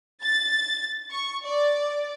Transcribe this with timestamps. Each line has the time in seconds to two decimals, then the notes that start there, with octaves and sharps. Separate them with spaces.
0.22 A6
1.10 C#6
1.45 D5